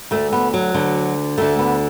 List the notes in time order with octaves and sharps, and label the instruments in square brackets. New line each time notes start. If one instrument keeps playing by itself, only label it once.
[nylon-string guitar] D2 D3 A3
B3
F#3
D2 D3
D2 D3 A3
B3